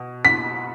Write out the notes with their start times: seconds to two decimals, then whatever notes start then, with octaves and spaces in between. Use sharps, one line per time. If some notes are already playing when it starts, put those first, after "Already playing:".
Already playing: B2
0.25 B6